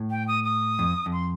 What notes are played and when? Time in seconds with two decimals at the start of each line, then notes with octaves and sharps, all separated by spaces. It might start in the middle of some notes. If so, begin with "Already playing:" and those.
Already playing: A2
0.10 G5
0.28 D#6
0.44 D#6
0.79 F2
1.06 F2
1.13 C6